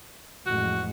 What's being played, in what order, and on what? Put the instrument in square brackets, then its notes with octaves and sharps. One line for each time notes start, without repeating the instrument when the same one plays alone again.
[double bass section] A1 F2 G#3 [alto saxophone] F#4